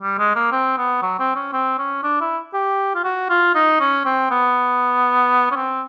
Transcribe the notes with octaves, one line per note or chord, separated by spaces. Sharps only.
G3
G#3
A#3
C4
B3
F#3
C4
C#4
C4
C#4
D4
E4
G4
F4
F#4
F4
D#4
C#4
C4
B3
C#4
C4